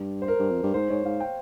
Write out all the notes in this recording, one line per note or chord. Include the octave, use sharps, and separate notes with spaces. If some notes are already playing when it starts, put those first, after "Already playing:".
Already playing: G2
C5
A#4
G2
F2
G2
G#2 C5
G#2 C#5
G#2 F5
G5